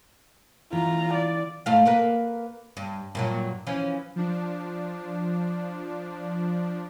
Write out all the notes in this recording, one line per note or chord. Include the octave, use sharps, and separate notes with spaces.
E3 F4 A#5
D5
G#2 A3 F5
A#3 A#4 B4
G2
G2 A#2 F#3
E3 F3 C#4
F3 D4